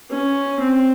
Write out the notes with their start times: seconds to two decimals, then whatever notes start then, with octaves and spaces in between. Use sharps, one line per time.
0.10 C#4
0.60 C4